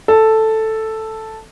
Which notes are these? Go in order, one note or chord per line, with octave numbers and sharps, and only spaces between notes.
A4